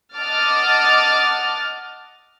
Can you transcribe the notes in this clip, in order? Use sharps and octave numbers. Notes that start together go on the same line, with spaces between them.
D#5 F#5 A5 D6 F6 A6